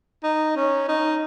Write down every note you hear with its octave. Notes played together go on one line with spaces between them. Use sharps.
D#4
C#4
D#4